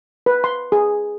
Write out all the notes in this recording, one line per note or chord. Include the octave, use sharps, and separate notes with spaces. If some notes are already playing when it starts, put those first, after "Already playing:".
B4
C6
G#4